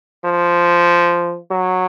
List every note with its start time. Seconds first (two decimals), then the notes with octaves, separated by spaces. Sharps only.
0.25 F3
1.51 F#3